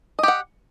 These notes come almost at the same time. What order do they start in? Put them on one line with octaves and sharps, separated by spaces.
D#5 G4 F#5